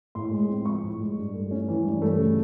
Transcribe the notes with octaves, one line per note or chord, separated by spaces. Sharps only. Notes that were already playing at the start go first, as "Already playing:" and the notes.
A2 C6
G#3
C4
F3 C#6
A2
G#3
G2
A3
C#4
E3
G2
A3
C#3